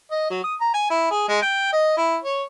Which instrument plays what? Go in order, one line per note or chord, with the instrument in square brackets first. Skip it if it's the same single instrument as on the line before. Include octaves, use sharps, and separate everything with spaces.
[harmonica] D#5
F#3
D#6
A#5
G#5
E4
G#4
G#3
G5
D#5
E4
C#5